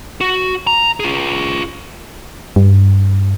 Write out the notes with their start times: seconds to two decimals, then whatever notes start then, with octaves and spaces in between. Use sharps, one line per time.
0.21 F#4
0.67 A#5
1.00 F4 G#4
2.56 G2